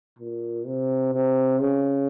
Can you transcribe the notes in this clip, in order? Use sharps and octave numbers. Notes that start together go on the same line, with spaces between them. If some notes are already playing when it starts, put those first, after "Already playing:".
A#2
C3
C3
C#3